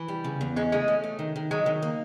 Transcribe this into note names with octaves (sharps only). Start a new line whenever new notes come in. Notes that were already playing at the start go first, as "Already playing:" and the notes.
Already playing: E3
G3
C#3
E2
G#3 C#4
G#3 A3
C#4
A3
D#3
D#3
F#3 G#3
D#3
A#3